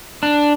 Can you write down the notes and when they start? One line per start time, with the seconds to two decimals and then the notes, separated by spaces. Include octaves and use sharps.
0.23 D4